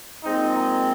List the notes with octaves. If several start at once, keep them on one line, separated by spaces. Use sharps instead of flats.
A#2 G#3 C4 D#4
D#4